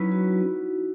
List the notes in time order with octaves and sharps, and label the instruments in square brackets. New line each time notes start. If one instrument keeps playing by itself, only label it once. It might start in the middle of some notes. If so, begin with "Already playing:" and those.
Already playing: [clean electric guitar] F#3 C#4 B4 [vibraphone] D#4 E4
[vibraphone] F#4